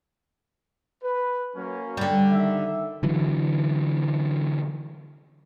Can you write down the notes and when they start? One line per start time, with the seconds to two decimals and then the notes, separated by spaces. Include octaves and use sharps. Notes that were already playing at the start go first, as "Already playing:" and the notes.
1.03 B4
1.55 F#3 A#3 C#4
1.97 D3 G3
2.31 D#3 E5
3.03 D3 E3 F#3